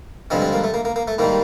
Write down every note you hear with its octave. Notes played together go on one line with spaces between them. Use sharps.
G2 D3 F3 G#3 C4
C4
A#3
A3
A#3
A#3
A#3
A3
G#2 D#3 G3 A#3